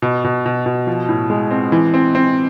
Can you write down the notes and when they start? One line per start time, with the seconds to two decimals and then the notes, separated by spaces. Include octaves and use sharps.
0.02 B2
0.24 B2
0.46 B2
0.66 B2
0.87 F3
1.09 A2
1.30 G#3
1.51 C4
1.72 E3
1.94 C4
2.15 C4